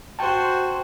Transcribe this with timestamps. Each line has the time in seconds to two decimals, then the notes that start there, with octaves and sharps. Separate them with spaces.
0.19 F#4 C5 G5 A5